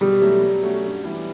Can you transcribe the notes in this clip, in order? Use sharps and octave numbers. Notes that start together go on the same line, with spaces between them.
B2 G3
F#3 A3 E4
F#3
A3 C#4 F#4
G2
E3 G3 B3 E4